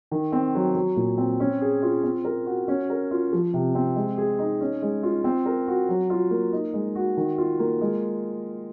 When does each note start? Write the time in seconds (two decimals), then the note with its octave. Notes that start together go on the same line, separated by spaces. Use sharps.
0.11 D#3
0.32 C4
0.55 F#3
0.75 F#3
0.96 A#2
1.18 C4
1.40 C#4
1.61 G#4
1.82 F4
2.04 C4
2.24 A#4
2.46 F#4
2.68 C#4
2.90 A#4
3.11 F4
3.33 F3
3.54 C3
3.75 C4
3.96 G#3
4.17 G#4
4.39 D#4
4.61 C#4
4.82 G#3
5.03 F4
5.24 C4
5.46 A#4
5.68 F#4
5.89 F#3
6.10 F4
6.31 A#3
6.53 D#4
6.74 G#3
6.95 F#4
7.17 D#3
7.38 F4
7.59 A#3
7.81 G#3